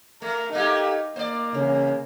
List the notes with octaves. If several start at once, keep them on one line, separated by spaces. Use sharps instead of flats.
A3 A#4
A3 A#3 D#4 G4
A#3 C5 D5
E2 C#3